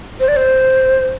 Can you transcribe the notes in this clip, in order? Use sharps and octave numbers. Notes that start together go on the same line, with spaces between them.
C5
D5
C5